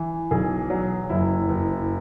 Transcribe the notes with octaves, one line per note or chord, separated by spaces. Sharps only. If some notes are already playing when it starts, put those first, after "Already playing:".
Already playing: E3
B1 G#4
F#3
F#1 E4
F#1